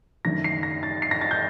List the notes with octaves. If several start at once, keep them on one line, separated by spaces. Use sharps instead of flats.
F#1 F#2 D#3 A3 D4 A#6
C7
A#6
A6
C7
A#6
A6
G6